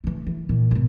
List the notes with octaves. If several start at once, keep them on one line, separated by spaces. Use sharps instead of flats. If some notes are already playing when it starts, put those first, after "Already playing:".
E3 A3
E3
A#2 E3
G#1 B2